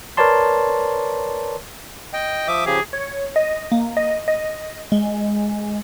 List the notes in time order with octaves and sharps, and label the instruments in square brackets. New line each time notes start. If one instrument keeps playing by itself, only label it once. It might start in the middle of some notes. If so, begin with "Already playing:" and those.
[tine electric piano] A#4 B4 C#5 D5 A5 C6
[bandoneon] D#5 G5
[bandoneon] F3 E5 D6 [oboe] D#6
[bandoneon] C#3 F3 G4 [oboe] G#4
[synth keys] C#5
D#5
A#3
D#5
D#5
G#3